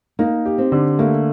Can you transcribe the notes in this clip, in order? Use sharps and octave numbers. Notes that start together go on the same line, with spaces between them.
A#3 D#4
G4
C4
D3
A3 A#3